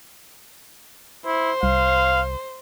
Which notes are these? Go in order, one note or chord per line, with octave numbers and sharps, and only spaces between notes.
E4 C5
C2 F5